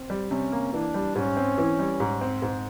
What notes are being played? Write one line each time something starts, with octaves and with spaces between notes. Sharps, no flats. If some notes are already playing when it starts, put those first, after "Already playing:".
Already playing: C4
G3
C3 C#4
A#3
E3 D4
G3
G#2 C#4
C4
E3
G3
G#2
C4
G#2